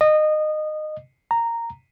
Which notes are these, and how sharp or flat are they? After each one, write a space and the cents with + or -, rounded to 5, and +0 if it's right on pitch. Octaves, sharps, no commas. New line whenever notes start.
D#5 -20
A#5 -10